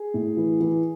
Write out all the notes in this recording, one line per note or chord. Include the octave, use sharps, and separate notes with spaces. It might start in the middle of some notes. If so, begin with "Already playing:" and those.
Already playing: G#4
A2
E3
E3